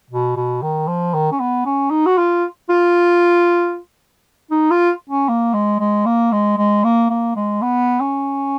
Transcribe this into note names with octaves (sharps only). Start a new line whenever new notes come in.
B2
B2
D#3
F3
D#3
C#4
B3
C#4
D#4
F#4
F4
F4
D#4
F4
C#4
A#3
G#3
G#3
A#3
G#3
G#3
A#3
A#3
G#3
B3
C#4